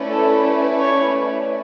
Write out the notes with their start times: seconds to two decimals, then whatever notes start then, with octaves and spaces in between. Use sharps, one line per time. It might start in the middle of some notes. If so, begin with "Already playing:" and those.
Already playing: A3 C#4 E4 B4 D5
0.09 A4
0.80 C#5